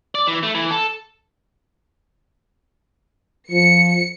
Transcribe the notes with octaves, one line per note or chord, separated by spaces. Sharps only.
D5
E3
A3
E3
A4
F3 C#7